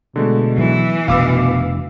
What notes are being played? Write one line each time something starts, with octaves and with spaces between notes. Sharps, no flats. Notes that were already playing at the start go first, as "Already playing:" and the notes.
B2 D3 G#3 A3
E3 F#3
F1 B2 A3 D4 F5 D6 E6